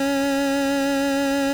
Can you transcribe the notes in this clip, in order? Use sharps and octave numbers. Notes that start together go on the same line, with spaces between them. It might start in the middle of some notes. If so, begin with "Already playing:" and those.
Already playing: C#4